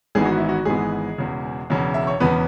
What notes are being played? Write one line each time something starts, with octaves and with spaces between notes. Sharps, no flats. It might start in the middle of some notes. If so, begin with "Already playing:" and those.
G#1 G#2 E3 B3 G#4
F#4
E4
F#4
G#1 G#2 E3 G#3 B3 G#4
E1 E2 C#3
E1 E2 C#3
E5
C#5
E1 E2 C#3 B3 B4